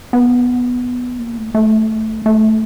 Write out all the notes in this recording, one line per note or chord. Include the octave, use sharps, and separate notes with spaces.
B3
A#3
A3
A3
A3